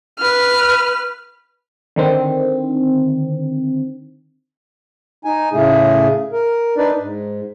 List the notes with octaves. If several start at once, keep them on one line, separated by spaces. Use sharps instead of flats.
B4 F6
D3 D#3 C4
D#4 G#5
A2 C#3 A3 G#4
A#4
D4 D#4 B4 D5
G#2